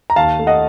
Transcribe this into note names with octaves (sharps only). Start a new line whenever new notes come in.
A#5
D#2 F5 A5
A3
D#5 F#5